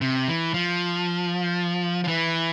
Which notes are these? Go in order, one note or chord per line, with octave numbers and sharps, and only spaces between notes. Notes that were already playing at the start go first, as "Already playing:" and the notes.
C3
E3
F3
F3
E3